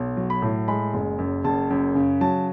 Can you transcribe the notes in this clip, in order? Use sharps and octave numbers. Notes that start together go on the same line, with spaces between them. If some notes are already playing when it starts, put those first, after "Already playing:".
Already playing: B1
F#3
B5
A2
G#3 B5
F#1
F#2
F#1 A5
F#2
C#3
F#3 A5